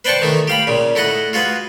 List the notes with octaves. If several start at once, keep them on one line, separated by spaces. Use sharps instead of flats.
B4 C5 D5 G5 A5 C#6
D#3 E3 A3
G4 F5 B5
A#2 C#3
A3 E4 D#5 F#5
F4 F#4 G#4 B4